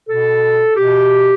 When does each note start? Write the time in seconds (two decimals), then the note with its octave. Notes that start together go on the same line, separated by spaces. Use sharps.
0.08 B2 A4
0.76 B2 G4